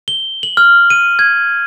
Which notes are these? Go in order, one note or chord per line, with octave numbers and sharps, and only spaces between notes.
G7
F#7
F6
D#7
G#6